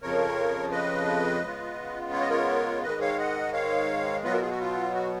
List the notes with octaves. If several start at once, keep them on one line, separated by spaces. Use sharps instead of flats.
F2 C#3 F3 A#4 C#5
B4 D#5
C#3 G#3 B3 F4
C#5
D#5
A#4 C#5
G#2 D#3 G#3 B4 D#5
C#5 F5
D#5 F#5
C#5 F5
B2 F#3 B3 F4 B4 D#5
F#4 A#4
F4 G#4
F#4
F4
F#4